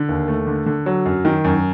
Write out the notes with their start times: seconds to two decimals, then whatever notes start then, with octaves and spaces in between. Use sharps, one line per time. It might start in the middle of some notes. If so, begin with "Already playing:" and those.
Already playing: D3
0.09 D#2
0.28 A3
0.47 D3
0.66 D3
0.86 F#3
1.06 F#2
1.25 D#3
1.44 F#2